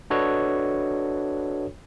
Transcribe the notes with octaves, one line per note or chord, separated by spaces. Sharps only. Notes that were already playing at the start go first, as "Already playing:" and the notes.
D4 F#4 A4 B4 C#5 D#5